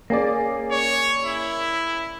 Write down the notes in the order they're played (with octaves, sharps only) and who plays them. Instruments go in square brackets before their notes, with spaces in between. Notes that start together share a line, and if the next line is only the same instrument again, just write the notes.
[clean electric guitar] A#3 [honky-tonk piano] C#4 G#4 D5
[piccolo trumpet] C#5
E4